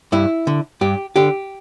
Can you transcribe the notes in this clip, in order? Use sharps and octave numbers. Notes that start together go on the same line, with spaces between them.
G2 E4
D3
G2 G4
D3 G4